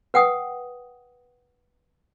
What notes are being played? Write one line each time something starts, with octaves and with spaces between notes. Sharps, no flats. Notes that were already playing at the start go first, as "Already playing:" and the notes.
B4 F#5 G5 D#6